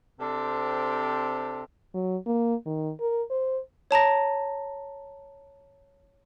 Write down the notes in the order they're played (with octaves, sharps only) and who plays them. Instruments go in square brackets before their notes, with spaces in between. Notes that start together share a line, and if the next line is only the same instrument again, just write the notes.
[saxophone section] C3 C4 D4 A4
[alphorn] F#3
A#3
D#3
A#4
C5
[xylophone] C#5 A5 A#5 A#6